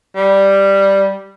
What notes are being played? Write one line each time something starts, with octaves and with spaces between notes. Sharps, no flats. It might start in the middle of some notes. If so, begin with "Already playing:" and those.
G3